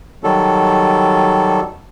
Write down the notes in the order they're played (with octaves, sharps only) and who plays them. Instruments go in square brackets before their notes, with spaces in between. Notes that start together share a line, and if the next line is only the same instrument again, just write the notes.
[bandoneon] D#3 F#3 G3 A4